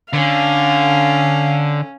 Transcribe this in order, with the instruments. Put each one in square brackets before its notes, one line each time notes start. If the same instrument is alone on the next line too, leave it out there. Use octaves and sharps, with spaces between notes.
[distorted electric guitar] D3 [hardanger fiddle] C#4 [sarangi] F5